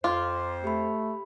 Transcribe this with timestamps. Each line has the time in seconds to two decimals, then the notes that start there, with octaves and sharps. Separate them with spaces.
0.04 F2 F4 C5 C6 D6
0.64 A3 G4 B5